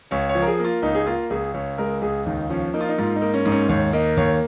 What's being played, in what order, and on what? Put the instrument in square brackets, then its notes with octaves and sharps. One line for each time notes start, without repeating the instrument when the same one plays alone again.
[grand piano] C#2 C#5
C#5
F3
A#4
G#4
A#3
F4
C#2 D#4
G#4
A#3 F4
C#2 G#4
C#2 C#5
G#3 A#4
C#2 G#4
D#2 D#4
F3 C#4
A#3 D#4
F4
D#4
G#2 F4
D#4
A#3
C#4
G#2
C#4
D#2 C#5
A#3 D#5
D#2 C#5